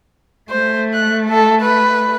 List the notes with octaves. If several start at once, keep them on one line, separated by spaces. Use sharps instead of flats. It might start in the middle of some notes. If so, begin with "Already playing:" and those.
A3 C5
F#6
A4
B4